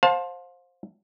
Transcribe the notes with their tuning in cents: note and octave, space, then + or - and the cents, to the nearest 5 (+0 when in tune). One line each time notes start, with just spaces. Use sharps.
C5 +15 F5 +30 A5 +0